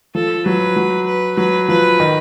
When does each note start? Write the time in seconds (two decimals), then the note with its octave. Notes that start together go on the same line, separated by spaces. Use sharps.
0.14 F3 A4
0.46 F#3 B4
0.76 F#3
1.06 B4
1.37 F#3 B4
1.68 F3 B4
2.00 D#3